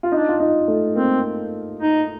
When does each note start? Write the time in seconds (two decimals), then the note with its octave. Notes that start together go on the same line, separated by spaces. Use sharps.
0.03 F4
0.12 D4 D#4
0.28 F4
0.40 D#4
0.68 A3
0.96 A#3 C4
1.80 D#4